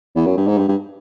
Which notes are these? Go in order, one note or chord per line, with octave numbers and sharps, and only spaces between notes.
E2
F#2
G2
G#2
G2
G2